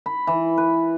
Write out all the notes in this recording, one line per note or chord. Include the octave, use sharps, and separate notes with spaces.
B5
E3
B4